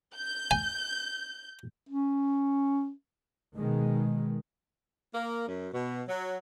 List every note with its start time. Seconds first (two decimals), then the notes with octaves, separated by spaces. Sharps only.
0.16 G6
0.51 G#5
1.89 C#4
3.57 B2 D#3 G#3
5.14 A#3
5.48 F#2
5.74 B2
6.09 F#3